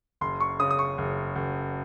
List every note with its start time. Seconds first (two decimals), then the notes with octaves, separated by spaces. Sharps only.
0.21 F#1 C6
0.40 C#6
0.60 C#3 D#6
0.71 D#6
0.79 C#6
0.98 F#1
1.35 F#1